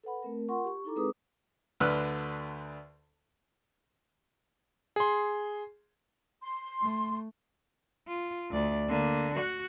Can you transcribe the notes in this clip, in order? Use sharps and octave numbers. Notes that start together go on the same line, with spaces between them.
A4 B4 F#5 B5
A3 C4 A#4
F4 A#4 F#5 C6 C#6
G4 C#6
D#4 E4 A4 A#5 D6
G#3 C4 G#4 B4 D6 D#6
D2 D3 B4 F6 F#6
G#4 C6
C6
A3
F4
D2 D5
D3 A#3
F#4 F#5